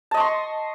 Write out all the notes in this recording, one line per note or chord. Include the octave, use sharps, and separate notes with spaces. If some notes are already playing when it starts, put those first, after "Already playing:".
D#5 A5 C6 C#6